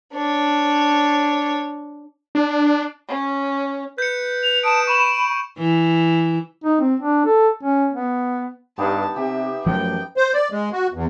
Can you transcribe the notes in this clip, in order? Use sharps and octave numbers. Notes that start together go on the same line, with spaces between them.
D4 C#5
D4
C#4
B4 G6 C#7
F7
A5 D#6 D7 E7
B5 C#6 E7
E3
D#4
C4
D4
A4
C#4
B3
G2 B3 D#4 G4 A5
C3 G4 E5
F#2 F3 F#3 A3 G5
C5
D5
G#3
F#4
E2